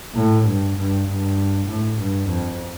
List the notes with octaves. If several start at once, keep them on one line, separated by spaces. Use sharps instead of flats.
A2
G2
G2
G2
A2
G2
F2